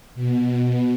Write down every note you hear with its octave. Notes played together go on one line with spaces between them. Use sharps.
B2